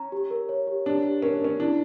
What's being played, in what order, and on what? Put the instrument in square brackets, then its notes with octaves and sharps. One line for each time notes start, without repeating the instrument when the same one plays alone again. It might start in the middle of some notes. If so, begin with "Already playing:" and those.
Already playing: [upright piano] C#4 [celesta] A#5
[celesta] G4
A#4
C#5
G4
[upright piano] D4 [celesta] G4
[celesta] G4
[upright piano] C#4 [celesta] A#4
[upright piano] D4
[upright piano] C#4 [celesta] A#4
[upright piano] D4 [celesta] E4